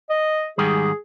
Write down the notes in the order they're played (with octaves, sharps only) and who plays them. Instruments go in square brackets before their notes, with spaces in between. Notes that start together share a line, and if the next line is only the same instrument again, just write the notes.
[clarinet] D#5
[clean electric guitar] G#2 D#3 G3 [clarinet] G#4